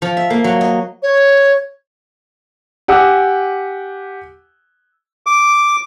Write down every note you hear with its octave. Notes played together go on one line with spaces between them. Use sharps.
F3
E5
A#3
F#3
D#5
C#5
G4 F#5 G#5 D6 E6
D6